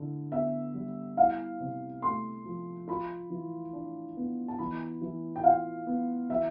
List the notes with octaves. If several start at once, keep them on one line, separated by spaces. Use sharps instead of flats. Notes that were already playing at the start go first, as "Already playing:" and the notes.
Already playing: D3 E4
B3 E5
G3
E4 F5
C3
A3 C6
F3
F4 B5
E3
D4
B3
A5
E3 B5
E3
G5
F4 F5
B3
E3 E5